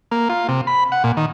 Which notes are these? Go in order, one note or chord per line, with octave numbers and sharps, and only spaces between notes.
A#3
F4
C3
B5
F#5
A#2
D#3